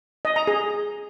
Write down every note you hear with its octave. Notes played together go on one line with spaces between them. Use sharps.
D#5
A#5
G#4